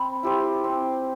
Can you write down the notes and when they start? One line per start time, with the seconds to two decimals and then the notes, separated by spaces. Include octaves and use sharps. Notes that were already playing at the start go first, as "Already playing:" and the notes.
Already playing: C4 B5
0.23 E4 G4 C5
0.64 C4